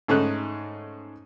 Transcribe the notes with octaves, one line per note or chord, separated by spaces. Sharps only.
G#2 A3 C#4 D#4 F#6